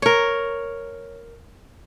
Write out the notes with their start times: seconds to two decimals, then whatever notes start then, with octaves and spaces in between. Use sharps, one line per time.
0.02 A#4 C#5